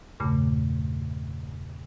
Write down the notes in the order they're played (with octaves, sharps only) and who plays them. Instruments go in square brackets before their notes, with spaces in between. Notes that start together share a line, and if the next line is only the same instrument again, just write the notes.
[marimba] E2 G2 A#2 C#3 A3